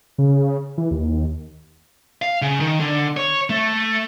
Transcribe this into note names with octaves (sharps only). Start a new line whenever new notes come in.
C#3
E3
D#2
F5
C#3
D#3
D3
C#5
A3